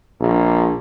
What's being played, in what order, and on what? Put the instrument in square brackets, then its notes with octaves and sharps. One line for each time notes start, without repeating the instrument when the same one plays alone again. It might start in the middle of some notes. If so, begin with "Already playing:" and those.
[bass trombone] A#1